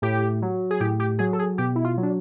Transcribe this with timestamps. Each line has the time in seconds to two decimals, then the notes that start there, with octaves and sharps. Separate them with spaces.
0.02 A2 G4
0.42 F#3
0.70 G#4
0.80 A2 G4
1.00 G4
1.19 F#3 G#4
1.33 A4
1.39 G#4
1.58 B2 G4
1.75 E4
1.84 F4
1.97 F#3
2.03 D4